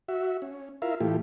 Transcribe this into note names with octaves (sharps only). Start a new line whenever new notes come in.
F#4 E5
C#4
E4 F4 A#4 E5 F5
A2 E3 A3 E4 F4 G4